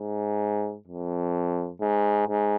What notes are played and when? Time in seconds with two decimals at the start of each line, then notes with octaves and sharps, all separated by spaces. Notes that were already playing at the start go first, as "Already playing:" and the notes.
Already playing: G#2
0.87 F2
1.81 G#2
2.28 G#2